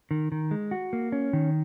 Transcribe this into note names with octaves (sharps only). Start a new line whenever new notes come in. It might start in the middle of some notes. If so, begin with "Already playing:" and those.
D#3
D#3
G#3
F#4
A#3
C#4
D#3